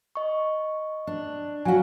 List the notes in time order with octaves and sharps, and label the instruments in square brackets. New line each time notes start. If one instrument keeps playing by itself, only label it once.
[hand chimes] D#5 C#6
[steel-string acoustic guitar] D4
[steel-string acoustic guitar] F#3 F#4 [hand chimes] F5 F#5 G#5